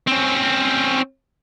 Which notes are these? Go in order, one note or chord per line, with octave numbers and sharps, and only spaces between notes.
C4 C#4